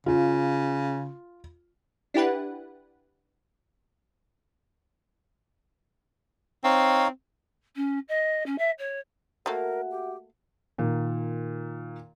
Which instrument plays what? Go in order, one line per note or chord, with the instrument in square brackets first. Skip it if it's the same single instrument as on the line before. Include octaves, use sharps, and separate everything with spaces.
[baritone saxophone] C#3 [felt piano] F4
[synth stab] D4 E4 G4 B4 F#5
[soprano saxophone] C4 [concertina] D#4 C#5 F5
[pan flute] C#4
D#5
C#4
E5
C#5
[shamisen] A3 A#3 [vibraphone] F#4 E5 F#5 [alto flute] A#4
[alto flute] G4
[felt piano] A#2 D#3